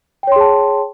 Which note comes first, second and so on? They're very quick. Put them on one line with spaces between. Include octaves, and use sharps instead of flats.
G5 C#5 C6 G#4 A5